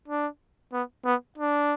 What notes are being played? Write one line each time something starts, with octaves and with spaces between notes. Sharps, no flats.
D4
B3
B3
D4